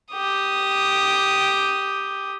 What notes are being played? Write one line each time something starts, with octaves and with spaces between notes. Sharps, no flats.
G4 D#6